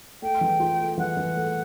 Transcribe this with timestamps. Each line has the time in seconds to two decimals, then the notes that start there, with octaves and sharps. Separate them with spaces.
0.22 A3 G5
0.41 E3
0.60 F4
0.79 A3
0.98 E3 F#5
1.17 E3
1.36 A3